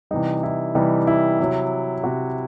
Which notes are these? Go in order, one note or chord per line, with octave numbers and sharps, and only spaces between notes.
C3 E3 G3 D#4
E4
C3 E3 G3 D#4
E4
C3 F#3
C3 F#3 F#4